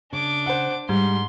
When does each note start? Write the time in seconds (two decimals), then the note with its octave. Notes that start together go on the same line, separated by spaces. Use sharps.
0.13 C#3 D4 D6
0.46 C5 F#5
0.89 G#2 G3 C6